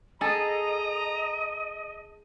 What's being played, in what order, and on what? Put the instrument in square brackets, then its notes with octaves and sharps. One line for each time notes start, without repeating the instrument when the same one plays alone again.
[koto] G#4 A4 [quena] D#5 [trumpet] A#5